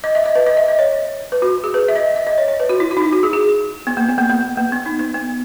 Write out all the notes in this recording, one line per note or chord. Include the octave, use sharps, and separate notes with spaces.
D#5
E5
D#5
B4
D#5
E5
D#5
C#5
B4
F#4
G#4
B4
E5
D#5
E5
D#5
C#5
C#5
B4
F#4
E4
F#4
D#4
E4
F#4
G#4
G#4
B3
A#3
B3
A#3
A#3
A#3
B3
D#4
B3
B3